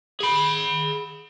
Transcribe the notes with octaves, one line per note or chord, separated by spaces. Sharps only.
G#4 B5